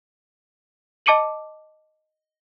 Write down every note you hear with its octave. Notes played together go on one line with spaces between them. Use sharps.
D#5 A5 D6 C#7 D#7 F#7